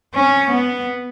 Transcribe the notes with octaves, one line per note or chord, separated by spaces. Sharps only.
C#4
B3